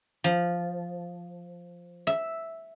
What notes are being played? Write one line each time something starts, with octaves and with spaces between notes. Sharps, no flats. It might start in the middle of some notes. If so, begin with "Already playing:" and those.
F3
E5